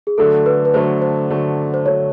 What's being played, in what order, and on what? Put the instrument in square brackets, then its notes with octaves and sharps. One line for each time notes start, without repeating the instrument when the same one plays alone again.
[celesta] G#4
[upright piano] D3 F#3 A3 [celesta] A4
[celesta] B4
B4
[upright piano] D3 F#3 A3 [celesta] C5
[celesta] C5
[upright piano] D3 F#3 A3
[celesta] C5
[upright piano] D3 F#3 A3 [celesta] C#5